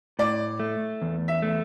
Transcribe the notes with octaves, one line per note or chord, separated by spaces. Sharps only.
A2 D5
A3
E2
E5
A3